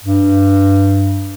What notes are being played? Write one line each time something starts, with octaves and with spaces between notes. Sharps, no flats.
G2